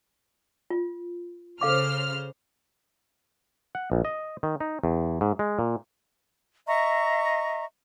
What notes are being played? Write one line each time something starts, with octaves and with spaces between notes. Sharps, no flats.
F4
C#3 A4 C5 F5 D6 F6
F#5
A#1
D#5
D#3
D#4
E2
G#2
G#3
A#2
D#5 E5 A#5 C#6